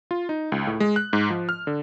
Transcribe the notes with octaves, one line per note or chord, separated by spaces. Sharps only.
F4
D#4
C#2
A2
G#3
F#6
G#2
F3
F6
D3